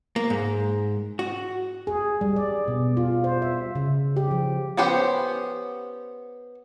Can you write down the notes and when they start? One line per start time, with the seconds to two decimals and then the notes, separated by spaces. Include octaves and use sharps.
0.16 A#3
0.30 G#2
1.19 F#4
1.87 G#4
2.21 G3
2.36 D5
2.68 B2
2.97 F4
3.24 C5
3.42 E5
3.75 C#3
4.16 G4
4.31 F3
4.77 B3 C#4 G4 C5 F#5